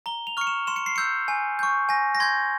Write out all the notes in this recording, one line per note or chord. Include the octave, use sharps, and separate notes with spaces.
A#5 G7
F7
C#6 F6 C#7
E7
C6 E7
C#7
C7
E6 G6 C#7
G#5
C#6 G6
G#5 A#6
A#6
C6 G6 G#6